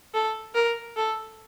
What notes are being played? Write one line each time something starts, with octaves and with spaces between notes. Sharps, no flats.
A4
A#4
A4